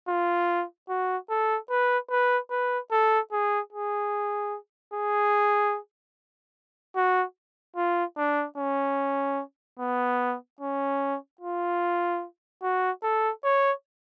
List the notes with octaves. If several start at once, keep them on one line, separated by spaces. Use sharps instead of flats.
F4
F#4
A4
B4
B4
B4
A4
G#4
G#4
G#4
F#4
F4
D4
C#4
B3
C#4
F4
F#4
A4
C#5